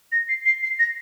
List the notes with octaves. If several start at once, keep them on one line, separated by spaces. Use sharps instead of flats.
A#6
C7
C7
C7
A#6